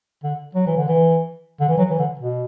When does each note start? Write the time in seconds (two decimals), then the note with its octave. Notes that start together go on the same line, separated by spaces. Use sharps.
0.24 D3
0.55 F#3
0.66 E3
0.77 D3
0.88 E3
1.60 D3
1.69 E3
1.78 F#3
1.90 E3
1.99 D3
2.19 B2